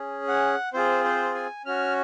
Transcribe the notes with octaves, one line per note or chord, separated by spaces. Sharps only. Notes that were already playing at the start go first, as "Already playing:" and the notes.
Already playing: C#4 G#4
F#5
C4 F4 G#4 C5
C5
G#5
C#4 F#4 F6